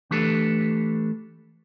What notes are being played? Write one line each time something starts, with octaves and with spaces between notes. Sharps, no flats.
E3 A3 D4 G4 A4 B4